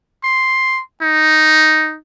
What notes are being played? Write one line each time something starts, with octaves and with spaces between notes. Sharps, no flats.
C6
D#4